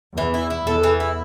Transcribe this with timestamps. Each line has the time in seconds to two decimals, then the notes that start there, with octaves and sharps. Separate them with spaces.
0.17 E2 E3
0.34 E4
0.50 E4
0.67 E2 A4
0.83 E3
1.00 E4